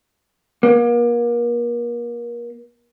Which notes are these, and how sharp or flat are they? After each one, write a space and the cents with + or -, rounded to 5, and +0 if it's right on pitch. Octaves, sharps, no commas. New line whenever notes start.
A#3 +35